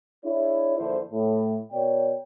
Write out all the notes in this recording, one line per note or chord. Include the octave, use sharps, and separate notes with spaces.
D4 E4 G#4 C#5
A#1 E2 D3 E4 C5
A2
B2 A#4 C#5 D5 G5